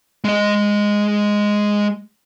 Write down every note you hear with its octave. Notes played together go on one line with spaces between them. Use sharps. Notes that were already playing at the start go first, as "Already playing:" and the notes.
G#3 D#5